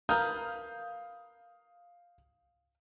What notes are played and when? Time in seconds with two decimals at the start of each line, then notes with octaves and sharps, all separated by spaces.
0.09 F4 A#4 B4 F5 D#6 G6